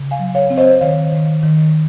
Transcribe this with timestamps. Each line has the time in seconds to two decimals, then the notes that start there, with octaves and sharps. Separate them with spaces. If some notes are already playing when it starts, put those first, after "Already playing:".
Already playing: C#3
0.11 F5 G#5
0.19 F#3
0.35 C#5 F5
0.50 C4
0.57 C5 D#5
0.81 D#3 C#5 F5
1.12 D#3
1.43 D#3